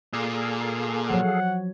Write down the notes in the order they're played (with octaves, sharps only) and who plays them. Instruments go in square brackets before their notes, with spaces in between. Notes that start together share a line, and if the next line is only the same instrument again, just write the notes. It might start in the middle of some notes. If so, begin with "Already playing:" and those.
[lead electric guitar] A#2 [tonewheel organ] G#4 A4 F5
[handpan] F3 F#3 C#5 [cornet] F#5